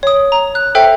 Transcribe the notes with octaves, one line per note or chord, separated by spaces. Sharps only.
C#5 D#6
A#5
F#6
A4 C5 E5 G5